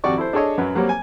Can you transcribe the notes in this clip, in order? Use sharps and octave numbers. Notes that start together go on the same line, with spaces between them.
G#1 F2 F#4 G4 D5 C#6
E4 A4 C5
D4 G#4 A4 C#5 D#5
F#2 F#3 B4
F#3 G3 A#3 C4 C#5
G#5